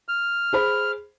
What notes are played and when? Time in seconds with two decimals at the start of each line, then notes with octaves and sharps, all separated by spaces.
0.08 F6
0.53 G#4 C5 B5